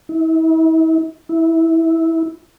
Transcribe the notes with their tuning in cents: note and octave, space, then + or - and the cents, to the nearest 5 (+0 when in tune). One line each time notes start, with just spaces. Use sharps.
E4 -40
E4 -15